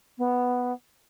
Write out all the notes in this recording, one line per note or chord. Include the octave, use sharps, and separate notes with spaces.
B3